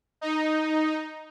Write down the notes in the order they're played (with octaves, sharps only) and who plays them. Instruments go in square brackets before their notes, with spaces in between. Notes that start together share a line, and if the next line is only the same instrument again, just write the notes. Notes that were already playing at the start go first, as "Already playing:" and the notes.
[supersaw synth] D#4